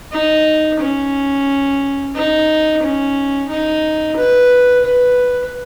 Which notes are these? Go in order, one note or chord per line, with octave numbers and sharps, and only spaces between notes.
D#4
C#4
D#4
C#4
D#4
B4
B4